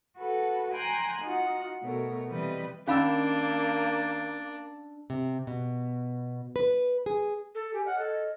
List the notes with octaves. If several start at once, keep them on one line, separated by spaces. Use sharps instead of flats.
F#4 A4 B4
G5 G#5 A#5 C6 F#6
D#4 F4 F#4 F#5
B2 A3 A#4 C#5
C3 E3 G3 B4 D#5
D#3 A#3 C#4 D4 F5 B5 E6
C3
B2
B4
G#4
A4
G4 G#5
C#5 D#5 F#5 F6
A4